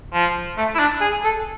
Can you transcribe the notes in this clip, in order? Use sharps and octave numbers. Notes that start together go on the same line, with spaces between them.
F3
A3
E4
D4
G#4
A4